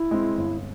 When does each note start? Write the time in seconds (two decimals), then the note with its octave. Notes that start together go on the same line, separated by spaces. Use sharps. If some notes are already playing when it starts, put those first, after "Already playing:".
Already playing: E4
0.11 G#3 C4
0.37 G1